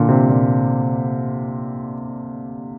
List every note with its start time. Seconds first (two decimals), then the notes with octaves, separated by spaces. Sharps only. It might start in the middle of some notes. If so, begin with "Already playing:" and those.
Already playing: A#2 D3
0.09 C3
0.29 A#2